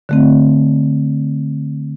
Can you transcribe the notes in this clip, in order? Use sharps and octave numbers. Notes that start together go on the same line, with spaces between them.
D3 A3 C4